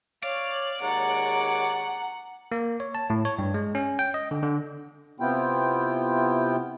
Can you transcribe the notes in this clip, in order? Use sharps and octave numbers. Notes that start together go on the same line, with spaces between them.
C#5 D5 F5
D#2 G#3 C#5 F#5 A#5
A#3
C#5
A5
A2
C#5
G2
G#3
C#4
G5
D#5
D3
D3
C3 B3 E4 F4 G5